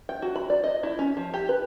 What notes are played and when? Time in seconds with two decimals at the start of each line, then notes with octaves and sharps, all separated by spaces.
0.09 G5
0.22 F#4
0.36 B5
0.50 D5
0.64 D#5
0.83 E4
0.99 C#4
1.17 F3
1.34 G4
1.49 B4